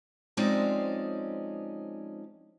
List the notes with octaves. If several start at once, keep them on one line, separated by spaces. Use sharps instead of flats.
F3 G#3 C4 C#4 D#4 D5